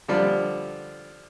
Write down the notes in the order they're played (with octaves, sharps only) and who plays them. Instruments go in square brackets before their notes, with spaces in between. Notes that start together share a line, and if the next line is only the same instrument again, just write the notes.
[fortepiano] D3 F3 G3